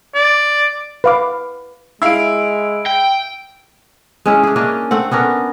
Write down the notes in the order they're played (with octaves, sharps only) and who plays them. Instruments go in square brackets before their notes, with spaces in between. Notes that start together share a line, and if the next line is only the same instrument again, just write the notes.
[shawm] D5
[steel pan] B4 F5 D6
[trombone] G#3 [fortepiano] E4 F5 [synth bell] E6 D7
[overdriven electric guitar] G5
[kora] G#3 C#4 E4
D4 G#4
A#3 C#4 D4 D#5
A3 C4 F#5
B3 C#4 D4 A#4